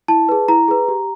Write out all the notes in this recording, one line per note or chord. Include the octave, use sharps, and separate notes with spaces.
E4 A5
G#4 B4
E4 A#5
G#4 B4
G4